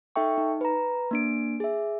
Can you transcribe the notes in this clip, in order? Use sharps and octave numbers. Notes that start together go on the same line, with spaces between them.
D#4 A4 E5 G5 C#6
D#4
B4 A#5
A#3 D4 D7
G#4 E5